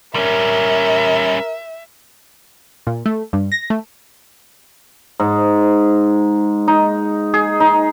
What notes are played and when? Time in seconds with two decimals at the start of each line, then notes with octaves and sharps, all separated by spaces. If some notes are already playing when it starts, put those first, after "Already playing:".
0.15 G3 C#4 A#4 E5
2.87 A#2
3.06 A3
3.33 G2
3.52 A#6
3.70 A3
5.20 G#2
6.68 D#4
7.34 G#4
7.60 D#4